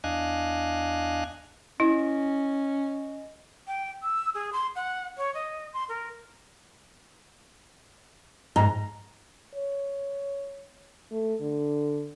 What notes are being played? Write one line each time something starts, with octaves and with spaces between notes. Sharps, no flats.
E2 D4 D#5 F5 G#5 F#6
C#4 E4 D#5
G5
E6
G#4
C6
F#5
C#5
D#5
C6
A#4
G#2 A#5
C#5
A3
D3